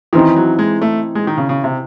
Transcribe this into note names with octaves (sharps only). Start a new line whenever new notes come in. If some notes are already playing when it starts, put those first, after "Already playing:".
D#3 E3 C4 D#4
F#3
G#3
A3
G#3
D#3
C#3
C#3
C3